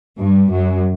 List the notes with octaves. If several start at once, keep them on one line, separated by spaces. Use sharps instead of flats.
G2 G3
F#2 F#3